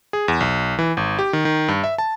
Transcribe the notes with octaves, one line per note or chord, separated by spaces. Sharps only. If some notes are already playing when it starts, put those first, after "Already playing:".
G#4
E2
B1
E3
G#1
G4
D#3
D#3
G2
E5
A5